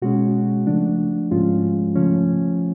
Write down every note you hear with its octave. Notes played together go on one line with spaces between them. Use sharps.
B2 G#3 C#4 F#4
C#3 F3 A3 D4
G#2 F3 G#3 C#4 F4
C#3 F3 A3 C#4